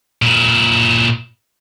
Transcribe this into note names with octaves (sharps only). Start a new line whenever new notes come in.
A#2 E4